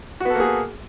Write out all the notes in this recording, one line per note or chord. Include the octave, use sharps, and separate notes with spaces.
A#3 B3 F#4 G#4 A4